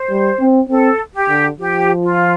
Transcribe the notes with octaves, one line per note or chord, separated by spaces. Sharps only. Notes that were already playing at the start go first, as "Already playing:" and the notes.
Already playing: C5
G3
C4
C4 A4
G4
D3
F3 G4
F4